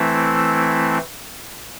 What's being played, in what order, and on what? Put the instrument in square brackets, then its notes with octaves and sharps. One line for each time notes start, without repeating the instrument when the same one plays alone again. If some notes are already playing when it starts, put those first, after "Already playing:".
Already playing: [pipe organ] E3 A3 C4 E4